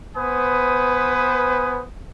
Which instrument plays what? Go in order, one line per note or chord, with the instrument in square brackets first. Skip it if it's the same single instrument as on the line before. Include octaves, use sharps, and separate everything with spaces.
[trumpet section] B3 B4 C5 G#5 D#6